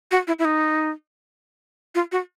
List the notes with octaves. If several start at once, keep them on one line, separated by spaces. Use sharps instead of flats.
F#4
E4
E4
D#4
F4
F#4